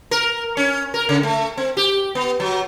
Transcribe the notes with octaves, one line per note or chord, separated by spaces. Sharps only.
A#4
C#4
A#4
C#3
A3
C4
G4
B3
F#3